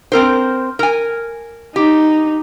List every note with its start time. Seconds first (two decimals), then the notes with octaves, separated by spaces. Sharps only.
0.12 C4 A#4 C5
0.79 A#4 G#5
1.76 D#4 G4